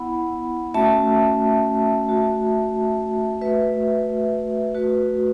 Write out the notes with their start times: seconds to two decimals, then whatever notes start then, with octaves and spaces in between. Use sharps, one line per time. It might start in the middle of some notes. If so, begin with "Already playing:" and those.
Already playing: B3 E4 F#5 B5
0.74 A3 C#4 F#4 E5 A5
2.08 A3 F#4
3.41 A3 F#4 B4 E5
4.75 A3 F#4 B4